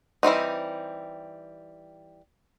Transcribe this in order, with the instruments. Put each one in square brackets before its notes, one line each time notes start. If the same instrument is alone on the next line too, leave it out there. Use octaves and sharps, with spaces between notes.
[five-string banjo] E3 G3 C4 D#4